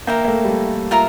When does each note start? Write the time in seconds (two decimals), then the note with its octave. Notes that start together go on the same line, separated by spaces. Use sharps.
0.07 A#3 A#4 E5 G5
0.25 A#3
0.28 A3
0.45 G3
0.49 A3
0.91 F4 A#4 E5 A#5